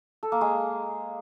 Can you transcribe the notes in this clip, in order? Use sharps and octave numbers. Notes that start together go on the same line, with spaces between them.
A4
A#3
G#3